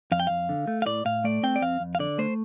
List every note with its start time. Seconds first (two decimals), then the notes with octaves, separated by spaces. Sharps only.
0.12 F2 F5
0.20 G5
0.27 F2 F5
0.49 D3
0.67 A3
0.82 F5
0.86 A2 D5
1.05 A2 F5
1.24 A3 D5
1.43 C4 G5
1.56 D5
1.61 F2 F5
1.80 F2
1.95 F5
1.99 D3 D5
2.18 A3 C5